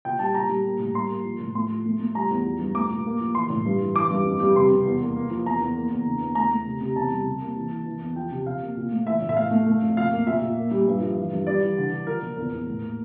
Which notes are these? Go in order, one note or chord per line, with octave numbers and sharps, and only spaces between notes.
A#2 G5
G3 A5
A#2 A#5
G3
A#3
A2
G3 C6
A#3
F3
A2
A3 C6
F3
A3
A3
G3 A#5
E2
F3
G2
A3 D6
A#2
A#3
F3
E3 C6
A2
G2
E3
E3 D6
G2
F2
G3
C3 C6
C3
E2
A#3
A#3
F3
E2 A#5
E2
A#3
E2
D3
E2
A3 A#5
A3
C3
C3
E2 A5
G3
C3
A#3
E3
E3
E3
E2
F3 G5
C3
C3 F5
A#3
A#2
A3
E3 E5
A2
E5
A2 F5
A3
A3
F2
A#2 F5
A#3
A#2 E5
A#2
A#3
G3
G2
F3
E3
G2
G3 D5
E3
D3
D3
F3 A#4
A#2
E2 A#4
E2
A2
A#3